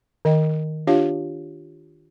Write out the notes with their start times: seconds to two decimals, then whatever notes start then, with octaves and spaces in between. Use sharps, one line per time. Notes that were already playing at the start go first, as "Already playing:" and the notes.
0.25 D#3 D#5 G5
0.87 D4 F4 G4 C#5 F5